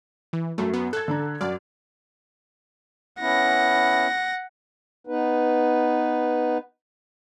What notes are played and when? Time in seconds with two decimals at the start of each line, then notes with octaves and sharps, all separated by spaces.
0.33 E3
0.58 F#2 F#3 A3
0.74 B3
0.93 A4 F#6 G#6
1.08 D3 D4 A#5
1.41 F#2 F#4 D5 F6
3.20 B3 C#4 E4 F#5 A#6
5.07 B3 D#4 B4